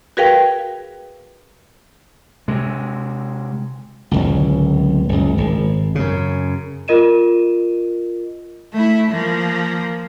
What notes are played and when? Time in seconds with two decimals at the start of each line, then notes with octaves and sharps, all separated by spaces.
0.17 F#4 G#4 A#4 B4 F5 G5
2.48 C3 G#3
4.11 D1 G1 C#2
5.09 F#1 C#2
5.38 G#1
5.95 F#2 C#3
6.88 F4 A#4 D#5 D#7 E7
8.73 A3 E4
9.11 F3 A#3